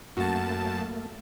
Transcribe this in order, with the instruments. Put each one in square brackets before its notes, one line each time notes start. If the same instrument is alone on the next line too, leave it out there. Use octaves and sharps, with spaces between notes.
[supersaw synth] F#2 A5 [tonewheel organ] A3 A#3 [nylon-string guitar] F#4